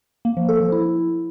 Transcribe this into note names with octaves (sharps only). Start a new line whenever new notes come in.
A#3
F3
A4
F3
E4